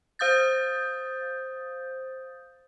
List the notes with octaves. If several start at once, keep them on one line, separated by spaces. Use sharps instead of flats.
C5 F5 D#6 G6 A6